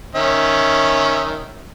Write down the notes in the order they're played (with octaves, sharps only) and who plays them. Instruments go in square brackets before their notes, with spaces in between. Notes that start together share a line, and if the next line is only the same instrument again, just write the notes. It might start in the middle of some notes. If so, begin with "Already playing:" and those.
[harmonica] D#3 C#4 E5